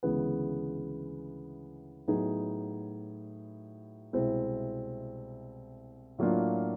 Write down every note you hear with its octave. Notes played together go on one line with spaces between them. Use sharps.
D2 C#3 E3 G#3 B3
A2 F#3 B3 D#4 G#4
C2 B2 G#3 C4 E4
A2 F#3 A#3 D4 F4